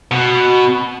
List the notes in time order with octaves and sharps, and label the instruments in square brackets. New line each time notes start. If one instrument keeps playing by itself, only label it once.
[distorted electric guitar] B2